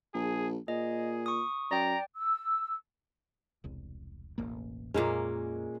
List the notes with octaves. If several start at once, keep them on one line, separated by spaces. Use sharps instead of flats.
A#1 G#4
A#2 G#4 D#5
C#6 D#6
F#2 D5 G5 A#5
E6
E1 C2
E1 A1 A#3
F2 A#2 G#3 A#3 C#4